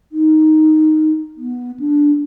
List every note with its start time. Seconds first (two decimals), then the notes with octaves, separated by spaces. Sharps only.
0.12 D#4
1.37 B3
1.80 D4